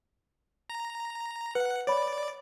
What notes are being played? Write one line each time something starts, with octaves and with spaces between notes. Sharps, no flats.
A#5
B4 F#5
C#5 D5 B5